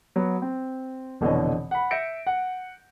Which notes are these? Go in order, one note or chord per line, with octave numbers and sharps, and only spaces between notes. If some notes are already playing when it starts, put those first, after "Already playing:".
F#3 B3
C4
F1 B2 D3 E3 C#5 D#5
F#5 B5
E5 G6 A#6 C#7 D7
F#5